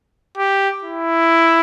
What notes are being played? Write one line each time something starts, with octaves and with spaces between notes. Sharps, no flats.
G4
E4